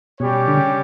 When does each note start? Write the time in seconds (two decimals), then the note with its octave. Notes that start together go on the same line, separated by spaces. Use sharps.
0.20 B2 G3 C#4 G4 C#5
0.48 D3
0.57 C#3